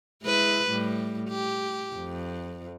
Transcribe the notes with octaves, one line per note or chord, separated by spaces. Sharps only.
G#3 E4 B4
A2 G3
G4
F2